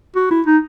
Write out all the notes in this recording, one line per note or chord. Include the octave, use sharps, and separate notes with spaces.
F#4
E4
D#4